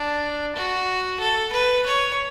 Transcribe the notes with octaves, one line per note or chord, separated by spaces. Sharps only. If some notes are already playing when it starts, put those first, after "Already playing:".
Already playing: D4
F#4
A4
B4
C#5